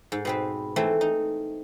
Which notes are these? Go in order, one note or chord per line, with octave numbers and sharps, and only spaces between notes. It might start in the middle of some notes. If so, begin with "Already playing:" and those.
G#2
B2 C4 B4
E3 A3 C4
D#4